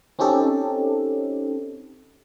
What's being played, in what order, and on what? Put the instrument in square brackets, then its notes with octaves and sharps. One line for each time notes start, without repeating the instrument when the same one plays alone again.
[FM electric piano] C4 C#4 D#4 G4 A4